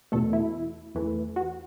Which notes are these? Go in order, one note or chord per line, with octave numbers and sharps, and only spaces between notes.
E2 B2 A3 A4
E4
E2 E3 A3
F#4